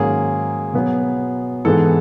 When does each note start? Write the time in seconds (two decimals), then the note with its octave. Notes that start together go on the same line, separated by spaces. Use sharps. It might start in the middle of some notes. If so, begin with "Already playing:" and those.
Already playing: G#2 D#3 F#3 A#3 C#4 G#4
0.74 B2 F#3 B3
1.65 G#2 E3 G#3 B3 A4